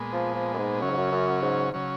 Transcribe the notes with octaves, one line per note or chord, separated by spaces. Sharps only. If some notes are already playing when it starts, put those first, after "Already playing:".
Already playing: A#2 G#3 B3
F3
F3
F#2
G#2
F#2 C#3 F#3 C#4
G#2
F#2
F#2
G#2
C#3 F#3 C#4